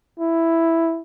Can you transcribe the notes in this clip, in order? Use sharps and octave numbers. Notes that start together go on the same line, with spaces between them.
E4